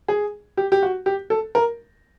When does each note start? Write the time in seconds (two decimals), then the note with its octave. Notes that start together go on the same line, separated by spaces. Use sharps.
0.08 G#4
0.57 G4
0.72 G4
0.83 F#4
1.06 G4
1.30 A4
1.55 A#4